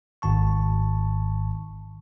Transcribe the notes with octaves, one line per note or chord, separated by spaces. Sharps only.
G#1 G#2 D#3 A5 C#6